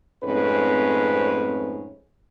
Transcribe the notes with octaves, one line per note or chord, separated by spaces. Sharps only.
F2 G#2 A3 C4 C#4 B4